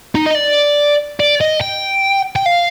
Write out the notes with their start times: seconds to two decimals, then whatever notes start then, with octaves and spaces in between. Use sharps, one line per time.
0.15 D#4
0.26 D#5
0.35 D5
1.20 D5
1.41 D#5
1.61 G5
2.36 G5
2.46 F5